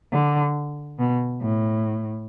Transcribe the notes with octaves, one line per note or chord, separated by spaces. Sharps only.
D3
B2
A2